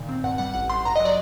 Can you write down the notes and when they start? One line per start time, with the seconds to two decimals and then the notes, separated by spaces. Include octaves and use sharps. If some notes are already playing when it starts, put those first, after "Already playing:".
Already playing: A#2 D#3
0.09 C4
0.24 G2 F#5
0.38 G3 F#5
0.54 A1 F#5
0.70 G3 C6
0.85 G2 A#5
0.96 D#5
1.00 F#3
1.05 D5